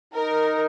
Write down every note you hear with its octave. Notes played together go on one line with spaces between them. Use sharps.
D#4 A#4